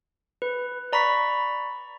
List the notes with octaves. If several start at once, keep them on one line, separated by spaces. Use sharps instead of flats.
B4
D5 A#5 B5 C#6 B6